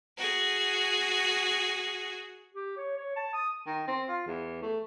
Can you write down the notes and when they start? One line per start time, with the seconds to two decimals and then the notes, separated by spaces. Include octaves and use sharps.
0.17 F#4 G#4
2.55 G4
2.77 C#5
2.98 C#5
3.16 A5
3.33 D#6
3.67 D#3
3.88 C4
4.09 F4
4.26 E2
4.62 A3